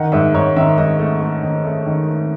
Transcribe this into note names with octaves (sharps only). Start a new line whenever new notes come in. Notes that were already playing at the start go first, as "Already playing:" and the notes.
Already playing: D#3 F#5
G#2 E5
G#2 C#5
D#3 E5
G#2 D#5
A3
A3
D#3
A3
D#3
A3